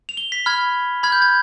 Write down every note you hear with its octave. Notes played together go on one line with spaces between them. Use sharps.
F7
G7
B6
B5 F6 G#6
B5 F6 G#6
G6
G#6